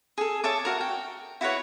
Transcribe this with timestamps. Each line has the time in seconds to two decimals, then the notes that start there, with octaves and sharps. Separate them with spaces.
0.18 G#4 A4
0.44 C#5 E5 A5 D6
0.65 F#4 A#4
0.81 G5
1.41 E4 F#4 B4 C#5